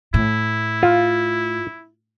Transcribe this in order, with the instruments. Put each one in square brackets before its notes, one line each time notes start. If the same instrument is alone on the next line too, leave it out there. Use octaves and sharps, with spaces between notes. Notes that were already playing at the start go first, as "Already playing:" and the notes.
[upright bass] A2 [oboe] E4
[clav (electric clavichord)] F4